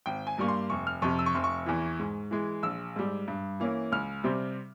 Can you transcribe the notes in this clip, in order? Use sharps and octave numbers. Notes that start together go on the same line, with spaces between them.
G#1 G5
G#5
G2 G3 A#3 C#6
C6
F1 C#6
F6
F2 C3 C#6
E6
C#6
F1 C6
C#6
E2 E3
G#2
E3 G#3
A#1 E6
G#2 G3
G2
E3 A#3 C#4 E4
C#2 F6
C3 G3 C4